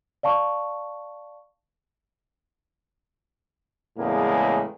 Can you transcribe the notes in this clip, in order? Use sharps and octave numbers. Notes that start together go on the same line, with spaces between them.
D5 F5 A5 C#6
E2 A2 C#3 G#3 A#3